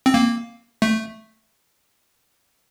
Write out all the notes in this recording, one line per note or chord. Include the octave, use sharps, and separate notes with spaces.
C4
A#3
A3